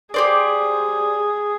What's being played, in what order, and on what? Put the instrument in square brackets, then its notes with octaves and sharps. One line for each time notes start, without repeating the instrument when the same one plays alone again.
[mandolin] G4 C5 D5 [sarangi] G#4